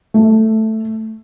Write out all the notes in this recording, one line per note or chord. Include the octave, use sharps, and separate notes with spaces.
A3